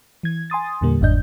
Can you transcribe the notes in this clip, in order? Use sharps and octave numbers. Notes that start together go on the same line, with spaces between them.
E3 G#6
G#5 C6 D#6 A6
E2 A#2 D3 G3 A#3
G1 E2 G#2 D4 D#5 G6